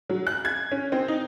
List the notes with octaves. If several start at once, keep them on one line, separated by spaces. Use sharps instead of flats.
F#3
F#6
G#6
C#4
C4
D#4